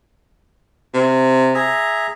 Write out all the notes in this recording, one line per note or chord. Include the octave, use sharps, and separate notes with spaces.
C3
G#4 E5 A#5